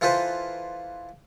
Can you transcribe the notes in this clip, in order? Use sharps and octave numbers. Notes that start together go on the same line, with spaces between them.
E3 F4 A4 B4 C5